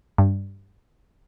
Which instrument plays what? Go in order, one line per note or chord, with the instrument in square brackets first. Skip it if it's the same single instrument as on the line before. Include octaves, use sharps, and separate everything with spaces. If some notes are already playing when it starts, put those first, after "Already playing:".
[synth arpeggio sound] G2